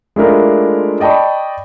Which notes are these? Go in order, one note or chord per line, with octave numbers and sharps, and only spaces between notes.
G#3 A3 D4 E4 F4 A#4
D5 D#5 G5 A5 B5 C#6